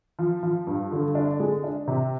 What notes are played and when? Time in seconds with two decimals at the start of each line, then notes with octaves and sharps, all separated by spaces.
0.19 F3
0.43 F3
0.67 G2
0.92 D3
1.15 D4
1.40 G#3
1.64 D4
1.87 C3